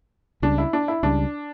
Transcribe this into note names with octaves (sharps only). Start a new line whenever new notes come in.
C#2 C#3 G3 D4
E4
D4
E4
C#2 C#3 G3 D4